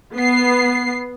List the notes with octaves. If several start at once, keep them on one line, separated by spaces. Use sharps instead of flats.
B3 C7